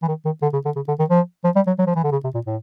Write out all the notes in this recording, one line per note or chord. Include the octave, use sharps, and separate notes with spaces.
E3
D#3
D#3
D3
C#3
D3
C#3
D3
D#3
F3
F3
G3
F#3
F#3
F3
E3
D3
C#3
C3
A#2
A2